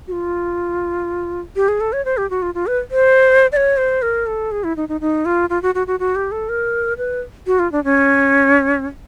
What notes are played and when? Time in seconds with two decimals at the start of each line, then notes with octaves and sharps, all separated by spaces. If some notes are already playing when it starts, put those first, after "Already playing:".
0.08 F#4
0.12 F4
1.56 G4
1.68 G#4
1.81 A4
1.93 C#5
2.05 C5
2.17 G4
2.30 F#4
2.42 F4
2.55 F4
2.67 B4
2.91 C5
3.52 D5
3.57 C#5
3.77 C5
4.02 A#4
4.26 A4
4.51 G#4
4.64 E4
4.77 D#4
4.89 D#4
5.01 D#4
5.25 F4
5.50 F4
5.62 F#4
5.75 F#4
5.87 F#4
6.00 F#4
6.15 G4
6.32 A4
6.49 A#4
6.98 B4
7.47 F#4
7.59 F4
7.72 D4
7.84 C#4